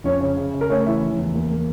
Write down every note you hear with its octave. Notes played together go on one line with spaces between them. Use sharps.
F2 C#4 C#5
C#3 C#4 C#5
C#3
C#3
A#4
A3 C#4 C#5
E3 E4 E5
F1
E2
A#3
A#3